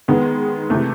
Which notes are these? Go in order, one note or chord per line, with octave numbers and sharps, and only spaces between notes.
D#3 G#3 B3
C3 E3 A3